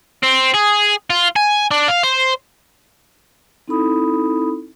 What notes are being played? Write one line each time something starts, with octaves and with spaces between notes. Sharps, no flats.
C4
G#4
F4
G#5
D4
F5
C5
C4 D#4 E4 A4 B5 D#6